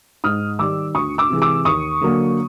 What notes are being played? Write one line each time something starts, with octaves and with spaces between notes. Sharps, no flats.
G#2 D#6 F6
D#3 G3 D6 E6
D2 C#6 D#6
D6 E6
C3 E3 G#3
D6 E6
D#2 C#6 D#6
D3 F#3 A#3